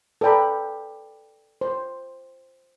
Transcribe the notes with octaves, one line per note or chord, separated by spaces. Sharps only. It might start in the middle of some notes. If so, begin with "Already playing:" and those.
A4 B4 D5 G5 A#5 B5
C5